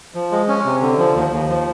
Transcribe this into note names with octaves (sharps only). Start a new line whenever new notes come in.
F3
G#3
C#4
C3
D3
F3
D#2
D#2
F3